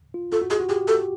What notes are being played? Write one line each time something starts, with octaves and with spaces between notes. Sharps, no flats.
F4
F4 A4
F#4
G4 G#4
F#4
G4 G#4
A4